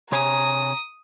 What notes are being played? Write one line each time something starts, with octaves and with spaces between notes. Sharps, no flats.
C3 C#5 G#5 A#5 D#6